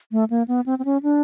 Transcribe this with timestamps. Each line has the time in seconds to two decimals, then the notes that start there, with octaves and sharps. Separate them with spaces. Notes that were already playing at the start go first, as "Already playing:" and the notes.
0.12 A3
0.30 A#3
0.48 B3
0.66 C4
0.79 C4
0.85 C#4
1.03 D4